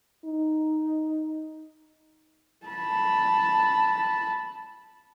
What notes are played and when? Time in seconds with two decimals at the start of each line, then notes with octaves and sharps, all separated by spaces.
0.25 D#4
2.66 A5 B5